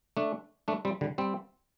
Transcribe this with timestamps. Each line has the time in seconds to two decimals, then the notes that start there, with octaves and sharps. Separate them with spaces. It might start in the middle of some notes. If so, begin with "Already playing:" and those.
0.17 A3 D4
0.68 A3 D4
0.85 G3 C4
1.01 D3 G3
1.18 G3 C4